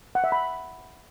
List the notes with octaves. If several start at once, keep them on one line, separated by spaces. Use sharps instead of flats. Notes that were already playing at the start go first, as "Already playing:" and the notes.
F#5
E5
B5